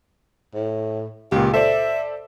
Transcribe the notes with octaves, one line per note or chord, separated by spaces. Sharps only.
A2
C#2 A#2 G4
A4 C5 D5 E5